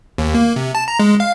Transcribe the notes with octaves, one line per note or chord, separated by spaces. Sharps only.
D#2
A#3
C3
A5
A#5
G#3
F5